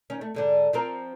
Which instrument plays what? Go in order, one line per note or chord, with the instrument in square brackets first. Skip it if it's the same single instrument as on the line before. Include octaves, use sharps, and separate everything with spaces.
[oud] D#3 C#4
A3
G#2 D3 D4
F3 C4 A#4